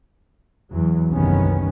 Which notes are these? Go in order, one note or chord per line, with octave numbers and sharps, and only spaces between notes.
E2 F#3
F#1 C2 D#3 B3 C#4